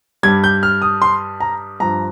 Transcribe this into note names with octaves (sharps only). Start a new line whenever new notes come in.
G2 G3 G#6
G6
F6
D#6
C6
A#5
G2 F3 A#5